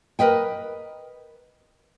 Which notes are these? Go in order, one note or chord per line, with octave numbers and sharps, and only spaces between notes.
A#4 B4 D#5 G5